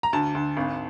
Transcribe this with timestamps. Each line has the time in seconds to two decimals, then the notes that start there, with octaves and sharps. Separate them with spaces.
0.03 A#5
0.13 D2 A5
0.35 D2
0.57 G#1